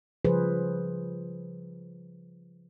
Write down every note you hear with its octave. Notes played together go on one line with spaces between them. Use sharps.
C#3 F3 G3 G#4 B4 C5